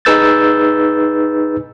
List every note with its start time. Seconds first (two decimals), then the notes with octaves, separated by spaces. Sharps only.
0.05 D#4 G#4 B4 E6 G6 A6